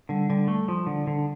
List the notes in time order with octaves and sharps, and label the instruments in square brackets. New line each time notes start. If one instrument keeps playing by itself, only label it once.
[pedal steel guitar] D3 [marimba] G3
[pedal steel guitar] D3 [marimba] G3
[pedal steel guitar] A3
F3
D3
D3